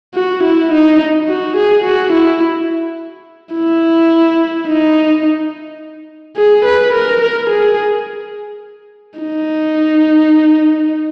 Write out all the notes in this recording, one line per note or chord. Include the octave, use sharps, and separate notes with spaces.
F#4
E4
D#4
F#4
G#4
F#4
E4
E4
D#4
G#4
B4
A#4
A#4
G#4
D#4